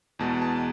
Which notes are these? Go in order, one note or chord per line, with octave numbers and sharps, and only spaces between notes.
E2 B2 G#3 A5
A5